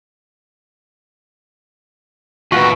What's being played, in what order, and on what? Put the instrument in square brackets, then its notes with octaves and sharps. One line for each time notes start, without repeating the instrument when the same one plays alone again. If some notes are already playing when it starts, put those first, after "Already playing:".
[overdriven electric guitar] D#2 A2 [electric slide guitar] F4 B4 [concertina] F#4 [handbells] C#6